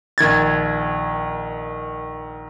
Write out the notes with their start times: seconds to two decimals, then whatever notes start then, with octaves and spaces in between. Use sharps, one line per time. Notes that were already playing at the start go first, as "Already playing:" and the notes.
0.18 A#1 D#3 G#6 A6